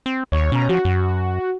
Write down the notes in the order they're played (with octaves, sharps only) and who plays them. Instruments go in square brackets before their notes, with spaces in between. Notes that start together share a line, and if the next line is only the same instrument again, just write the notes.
[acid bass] C4
[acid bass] D#2 [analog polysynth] C#5
[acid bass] B2 [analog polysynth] C#4 A#5
[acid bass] F3 [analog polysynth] F#4
[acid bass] F#2